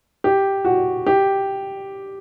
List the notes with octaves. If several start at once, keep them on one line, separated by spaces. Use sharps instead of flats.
G4
F#4
G4